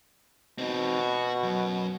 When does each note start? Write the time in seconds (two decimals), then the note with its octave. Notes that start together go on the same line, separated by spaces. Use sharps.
0.58 B2 C4 D#4
0.99 F#4
1.43 F#2 F#3